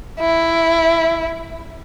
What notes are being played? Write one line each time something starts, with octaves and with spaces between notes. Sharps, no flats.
E4